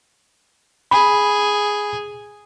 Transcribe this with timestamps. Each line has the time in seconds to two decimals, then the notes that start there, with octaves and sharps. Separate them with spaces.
0.91 G#4 B5